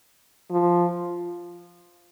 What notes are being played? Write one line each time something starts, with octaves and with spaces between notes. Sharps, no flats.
F3